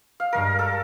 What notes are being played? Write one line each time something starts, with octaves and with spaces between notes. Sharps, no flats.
F5
G2 G#3 A#4 C#6
A4